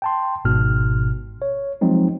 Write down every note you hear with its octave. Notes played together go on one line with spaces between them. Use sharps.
G5 A5 C6
G#1 G#2 B2 F6
C#5
F3 F#3 G#3 C4 D#4